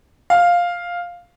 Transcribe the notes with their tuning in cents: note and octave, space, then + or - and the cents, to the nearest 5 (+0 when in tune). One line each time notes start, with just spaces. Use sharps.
F5 +5